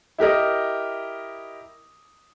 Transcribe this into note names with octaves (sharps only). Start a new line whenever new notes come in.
E4 G4 A#4 D#5